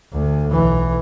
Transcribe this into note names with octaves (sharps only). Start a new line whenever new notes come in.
D2
B1 E3